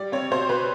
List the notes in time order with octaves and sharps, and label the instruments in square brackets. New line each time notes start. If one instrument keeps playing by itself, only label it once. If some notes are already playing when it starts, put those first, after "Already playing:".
Already playing: [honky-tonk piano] G3 D5
C4 C#5
B2 C5
B2 B4